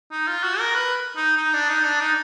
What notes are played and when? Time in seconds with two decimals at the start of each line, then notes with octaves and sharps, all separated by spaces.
0.12 D#4
0.27 F4
0.43 F#4
0.59 A#4
0.75 B4
1.16 D#4
1.37 D#4
1.53 D4
1.69 D#4
1.84 D4
2.00 D#4